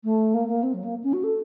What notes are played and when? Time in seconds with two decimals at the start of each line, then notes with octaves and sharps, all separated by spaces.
0.04 A3
0.34 A#3
0.48 A#3
0.63 C4
0.74 F#3
0.84 A#3
1.04 C#4
1.13 F#4
1.24 A4